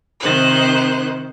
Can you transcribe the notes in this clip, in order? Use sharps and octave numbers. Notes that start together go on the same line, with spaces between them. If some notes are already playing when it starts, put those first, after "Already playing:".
C3 D#3 C5 F#6